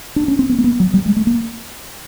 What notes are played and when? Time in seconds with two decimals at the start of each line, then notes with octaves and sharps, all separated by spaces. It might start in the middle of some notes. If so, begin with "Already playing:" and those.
0.16 D4
0.28 C#4
0.39 C4
0.49 B3
0.58 A#3
0.64 B3
0.80 F#3
0.94 G3
1.06 G#3
1.16 A3
1.27 A#3